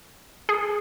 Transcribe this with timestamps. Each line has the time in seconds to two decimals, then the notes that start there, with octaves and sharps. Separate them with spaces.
0.49 G#4